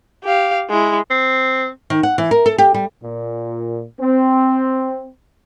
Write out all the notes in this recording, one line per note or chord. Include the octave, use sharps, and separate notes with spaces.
G4 F5
G#3 E4
C4
D#3
F#5
E3
A#4
A4
G4
G3
A#2
C4